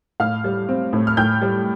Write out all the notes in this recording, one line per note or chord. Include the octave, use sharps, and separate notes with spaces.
A2 F5 F6
G3
C4
A2
F6
A2 G5 G6
G3